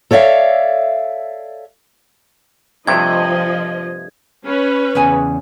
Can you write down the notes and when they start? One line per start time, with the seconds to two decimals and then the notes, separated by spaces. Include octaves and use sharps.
0.11 A4 C#5 D5 E5 F5
2.87 G2 C3 F3 A3 D#5 G#6
4.45 C#4 B4
4.95 E2 C#3 G#5